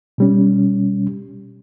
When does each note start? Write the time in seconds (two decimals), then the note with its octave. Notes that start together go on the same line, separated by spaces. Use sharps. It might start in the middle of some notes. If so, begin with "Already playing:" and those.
0.18 B2 G3 C#4